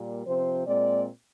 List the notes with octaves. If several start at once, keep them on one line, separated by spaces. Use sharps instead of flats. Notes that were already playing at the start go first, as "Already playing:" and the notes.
Already playing: A#2 G3 A#3
C3 F3 C4 C5
A#2 G#3 C4 D5